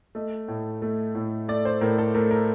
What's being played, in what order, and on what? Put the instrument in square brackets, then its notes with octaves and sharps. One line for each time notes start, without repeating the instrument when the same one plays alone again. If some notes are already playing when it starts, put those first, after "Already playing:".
[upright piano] A3 D#5
A2
A3
A2
A3 D5
C5
A2 A#4
A4
A3 A#4
A#4